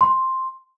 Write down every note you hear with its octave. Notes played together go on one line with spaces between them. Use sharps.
C6